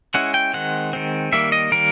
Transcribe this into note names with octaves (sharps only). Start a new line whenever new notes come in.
G#3 C#4 E4 F#5
G5
D#3 G#3 C4 F#5
D#3 G#3 C4
D#3 G3 A#3 E5
D#5
D#3 G3 A#3 A#4